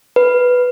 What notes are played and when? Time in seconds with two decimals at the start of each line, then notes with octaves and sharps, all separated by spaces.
0.16 B4